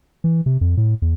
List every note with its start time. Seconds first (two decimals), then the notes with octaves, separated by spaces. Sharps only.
0.24 E3
0.46 C3
0.61 F2
0.77 A2
1.02 E2